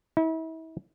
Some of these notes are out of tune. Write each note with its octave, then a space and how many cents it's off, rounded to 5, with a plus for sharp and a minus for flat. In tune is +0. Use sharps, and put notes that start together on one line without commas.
E4 -40